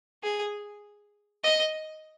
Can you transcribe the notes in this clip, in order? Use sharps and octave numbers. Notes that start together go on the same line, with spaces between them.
G#4
D#5